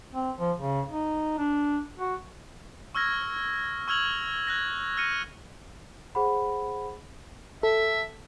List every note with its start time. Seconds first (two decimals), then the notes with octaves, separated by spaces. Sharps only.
0.13 C4
0.40 F3
0.59 C#3
0.89 D#4
1.38 D4
1.98 F#4
2.95 C#6 E6 F6 G#6 A#6
3.88 C#6 E6 F6 G#6 F7 F#7
4.47 F#6 G#6 A#6
4.97 F6 A#6 C#7 D#7
6.15 G#4 C5 F#5 B5
7.63 A4 E5